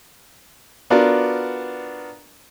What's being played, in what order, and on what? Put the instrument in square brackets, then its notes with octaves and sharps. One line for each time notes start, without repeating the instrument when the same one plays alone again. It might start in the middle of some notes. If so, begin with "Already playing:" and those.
[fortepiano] B3 D4 F4 F#4 A#4 D5